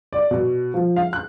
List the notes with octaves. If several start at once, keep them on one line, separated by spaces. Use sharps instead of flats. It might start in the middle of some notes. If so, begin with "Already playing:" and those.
D5
B2
F3
F5
F#6